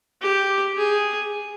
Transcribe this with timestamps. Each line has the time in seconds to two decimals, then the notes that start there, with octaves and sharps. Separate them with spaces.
0.22 G4
0.77 G#4